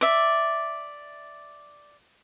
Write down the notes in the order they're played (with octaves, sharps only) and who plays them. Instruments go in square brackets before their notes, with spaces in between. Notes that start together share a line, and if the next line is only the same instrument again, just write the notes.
[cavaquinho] D5 E5